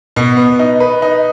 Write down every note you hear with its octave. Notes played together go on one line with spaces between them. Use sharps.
B2
B3
D#4
B4
D#4